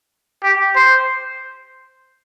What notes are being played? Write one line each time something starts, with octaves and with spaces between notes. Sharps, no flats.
G4
C5